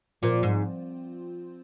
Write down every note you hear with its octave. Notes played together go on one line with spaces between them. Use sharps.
A#2 F3 C4 F4 C5
G#2